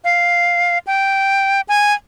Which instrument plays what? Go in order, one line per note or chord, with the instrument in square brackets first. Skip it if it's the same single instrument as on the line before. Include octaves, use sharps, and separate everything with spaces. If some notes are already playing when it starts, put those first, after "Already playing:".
[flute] F5
G5
G#5